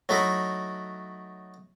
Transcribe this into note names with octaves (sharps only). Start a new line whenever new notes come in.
F#3 A3 D#4 E4